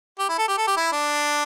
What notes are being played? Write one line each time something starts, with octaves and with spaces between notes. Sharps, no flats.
G4
E4
A4
G4
A4
G4
E4
D4